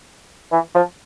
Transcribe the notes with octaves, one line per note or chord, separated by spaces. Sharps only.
E3
F3